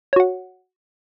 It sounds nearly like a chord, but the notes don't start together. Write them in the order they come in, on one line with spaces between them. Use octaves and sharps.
C#5 F#4 F#5